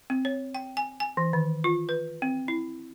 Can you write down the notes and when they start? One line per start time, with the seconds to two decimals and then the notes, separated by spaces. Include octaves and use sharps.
0.10 C4
0.25 C#5
0.55 G5
0.77 G#5
1.00 G#5
1.17 E3
1.33 D#3
1.64 F4
1.89 B4
2.22 C4
2.48 E4